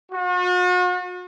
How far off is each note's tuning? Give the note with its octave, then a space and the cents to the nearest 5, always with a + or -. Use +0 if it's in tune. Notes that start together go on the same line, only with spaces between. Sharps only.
F#4 -45